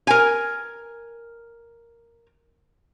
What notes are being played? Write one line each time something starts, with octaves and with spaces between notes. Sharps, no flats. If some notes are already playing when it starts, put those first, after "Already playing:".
A#4 G#5